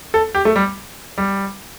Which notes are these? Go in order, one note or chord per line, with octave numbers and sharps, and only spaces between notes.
A4
G4
A3
G3
G3